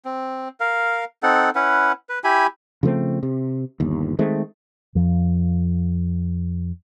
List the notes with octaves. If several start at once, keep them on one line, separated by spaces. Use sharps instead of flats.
C4
A#4 F5
C4 D#4 A4 F#5
C#4 E4 B4 F#5
B4
E4 G4 G#5 B5
C#3 F3 A3 C4
C3
G1 D#2
D#3 G#3 A3 C4
F2 F3